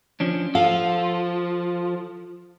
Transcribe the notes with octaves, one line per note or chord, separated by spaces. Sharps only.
F3 C#4 D4
F3 A4 F5